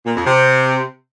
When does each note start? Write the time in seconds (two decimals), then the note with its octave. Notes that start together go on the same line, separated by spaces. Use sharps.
0.05 A#2
0.15 F2
0.26 C3